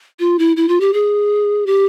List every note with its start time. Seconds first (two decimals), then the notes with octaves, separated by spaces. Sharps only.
0.20 F4
0.39 E4
0.57 E4
0.68 F4
0.80 G4
0.93 G#4
1.66 G4